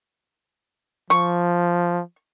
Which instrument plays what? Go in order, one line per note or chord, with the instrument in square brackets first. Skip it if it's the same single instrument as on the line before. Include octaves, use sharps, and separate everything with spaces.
[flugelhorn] F3 [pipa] C#6